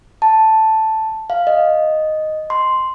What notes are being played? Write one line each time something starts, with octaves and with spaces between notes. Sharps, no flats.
A5
F5
D#5
C6